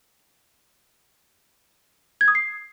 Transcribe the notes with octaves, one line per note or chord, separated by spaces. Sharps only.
G#6
D#6
C7